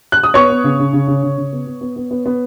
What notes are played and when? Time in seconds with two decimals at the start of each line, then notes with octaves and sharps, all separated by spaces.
0.12 F#6
0.23 D#6
0.34 B3 C#5 C#6
0.50 B3
0.64 C#3
0.79 C#3
0.93 C#3
1.08 C#3
1.23 C#3
1.37 C#3
1.52 B3
1.67 B3
1.81 B3
1.96 B3
2.11 B3
2.26 B3